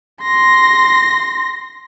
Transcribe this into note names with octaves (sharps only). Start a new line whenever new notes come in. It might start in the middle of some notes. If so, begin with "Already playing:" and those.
C6 A#6